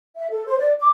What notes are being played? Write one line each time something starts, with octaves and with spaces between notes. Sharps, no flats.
E5
A4
C5
D5
D6